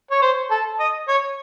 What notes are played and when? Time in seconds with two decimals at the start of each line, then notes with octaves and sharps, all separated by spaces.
0.11 C#5
0.22 C5
0.51 A4
0.79 D#5
1.08 C#5